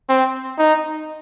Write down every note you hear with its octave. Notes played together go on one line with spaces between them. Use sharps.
C4
D#4